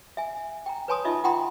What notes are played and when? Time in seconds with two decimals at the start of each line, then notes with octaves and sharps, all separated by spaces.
0.17 E5 G#5
0.66 G5 A#5
0.88 B4 C#5 G#5 A5 C6 D#6
1.05 D#4 F4 D#5 E5
1.24 F4 F#5 G5 A#5 C6